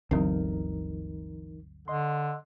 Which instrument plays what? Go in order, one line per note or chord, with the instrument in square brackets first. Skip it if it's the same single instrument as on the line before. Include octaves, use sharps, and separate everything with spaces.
[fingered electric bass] G1 D2 [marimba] D3 F#3 C4 [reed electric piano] E3 D#4 A#4
[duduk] D3 [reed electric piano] D#5 C6